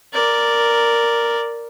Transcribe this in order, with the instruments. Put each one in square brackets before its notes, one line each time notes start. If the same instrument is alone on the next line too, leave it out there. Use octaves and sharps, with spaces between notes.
[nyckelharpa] A#4 D5